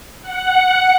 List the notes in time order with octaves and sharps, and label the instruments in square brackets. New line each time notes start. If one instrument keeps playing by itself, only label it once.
[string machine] F#5